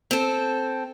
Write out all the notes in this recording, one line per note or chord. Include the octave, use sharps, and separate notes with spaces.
C4 A4